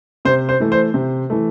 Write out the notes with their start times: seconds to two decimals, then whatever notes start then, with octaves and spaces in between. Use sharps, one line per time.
0.25 C3 C5
0.49 C5
0.60 E3 A3
0.72 C5
0.94 C3
1.30 E3 A3